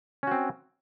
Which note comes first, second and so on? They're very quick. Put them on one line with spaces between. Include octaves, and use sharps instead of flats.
C#4 F#4 C4